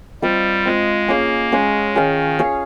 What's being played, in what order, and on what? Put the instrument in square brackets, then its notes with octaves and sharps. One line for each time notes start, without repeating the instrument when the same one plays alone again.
[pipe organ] G3 [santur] C4 F4 C5 D#5
[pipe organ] G#3 [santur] C4 F4 C5 D#5
[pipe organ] A#3 [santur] C#4 G#4 C#5 F5
[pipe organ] G#3 [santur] C#4 G#4 C#5 F5
[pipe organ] D#3 [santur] C#4 G#4 C#5 F5
[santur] C#4 G#4 C#5 F5